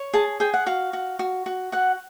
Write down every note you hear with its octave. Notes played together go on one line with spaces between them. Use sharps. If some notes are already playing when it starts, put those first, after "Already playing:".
Already playing: C#5
G#4 A5
G#4 G5
F#5
F#4 F5
F#4
F#4
F#4
F#4 F#5